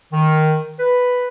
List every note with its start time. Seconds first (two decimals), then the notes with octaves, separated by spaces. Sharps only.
0.13 D#3
0.79 B4